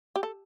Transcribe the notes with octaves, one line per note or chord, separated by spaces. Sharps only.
G4
A4